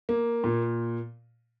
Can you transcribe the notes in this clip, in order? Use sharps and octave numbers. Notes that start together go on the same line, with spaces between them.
A#3
A#2